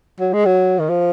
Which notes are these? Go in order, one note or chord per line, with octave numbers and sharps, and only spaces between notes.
F#3
G#3
F#3
D#3
F3